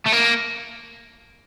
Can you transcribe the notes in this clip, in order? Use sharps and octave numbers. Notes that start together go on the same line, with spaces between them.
A3
A#3